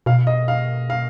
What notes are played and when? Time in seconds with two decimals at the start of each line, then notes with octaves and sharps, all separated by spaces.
0.06 B2 F5
0.27 D#5
0.48 F5
0.90 F5